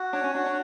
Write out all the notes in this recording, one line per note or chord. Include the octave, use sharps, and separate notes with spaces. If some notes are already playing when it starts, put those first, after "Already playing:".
Already playing: F#4
D4 C#5
C#4
D4 F#4
D4